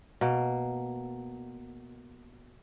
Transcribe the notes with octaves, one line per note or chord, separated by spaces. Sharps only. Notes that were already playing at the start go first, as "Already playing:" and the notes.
B2 A#3